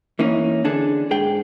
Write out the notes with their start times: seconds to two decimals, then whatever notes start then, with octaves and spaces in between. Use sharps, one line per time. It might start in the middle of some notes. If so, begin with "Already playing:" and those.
0.19 E3 A#3 C#4 D#4
0.64 D3 D4 G#4 A4
1.11 G#2 G#4 G5